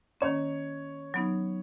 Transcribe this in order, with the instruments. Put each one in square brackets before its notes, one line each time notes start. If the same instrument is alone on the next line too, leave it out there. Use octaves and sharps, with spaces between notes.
[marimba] D#3 A#3 C#4 [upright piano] C#5
[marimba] F#3 B3 D#4